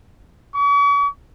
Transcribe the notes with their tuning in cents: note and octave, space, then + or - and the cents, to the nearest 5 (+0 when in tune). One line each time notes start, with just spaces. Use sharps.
C#6 +45